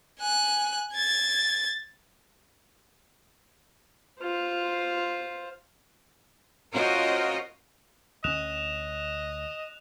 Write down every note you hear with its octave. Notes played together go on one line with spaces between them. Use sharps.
G#5 F#6
G#6 A6
F4 C5
C#4 F4 F#4 A#4 C5 D#5
D2 C#4 D#5 F#6 E7 F7